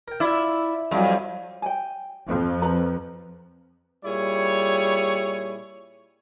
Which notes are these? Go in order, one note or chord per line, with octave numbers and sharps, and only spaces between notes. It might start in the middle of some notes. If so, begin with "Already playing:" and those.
A#4 G5
E4 F4 D5
F2 F#3 G3
G5 G#5
F2 F3
B4 A#5
A#2 G3 E4 G#4 C#5